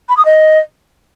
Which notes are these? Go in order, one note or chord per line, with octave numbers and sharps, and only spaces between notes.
B5
D#6
D#5